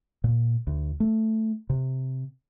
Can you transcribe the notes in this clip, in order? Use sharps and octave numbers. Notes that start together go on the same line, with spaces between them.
A#2
D2
A3
C3